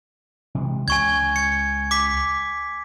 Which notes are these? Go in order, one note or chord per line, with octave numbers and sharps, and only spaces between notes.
C3 E3 G#3
C#2 G#5 C#6 G#6
G#6 C#7
D6 B6